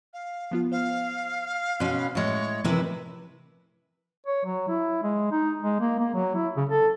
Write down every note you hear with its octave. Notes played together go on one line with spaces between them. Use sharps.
F5
F3 B3 F4
C5 F5
B2 C#4 B5 C6 F#6
A2 G#3 C#5
C3 E3 F3 E4 A#4 B4
C#5
F#3
E4
G#3
D#4
G#3
A#3
A#3
F#3
E4
C#3
A4